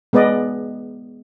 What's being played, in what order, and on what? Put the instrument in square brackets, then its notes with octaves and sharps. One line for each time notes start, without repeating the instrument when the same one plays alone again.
[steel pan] G#3 B3 B4 D5 D#5